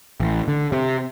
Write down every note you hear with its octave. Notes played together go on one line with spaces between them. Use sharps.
A1
D3
C3